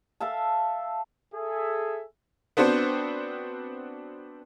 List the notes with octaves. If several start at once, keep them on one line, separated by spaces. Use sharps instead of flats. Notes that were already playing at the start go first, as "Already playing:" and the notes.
A4 E5 F5 A5
G#4 A4 E5
B3 C4 D4 F#4 C5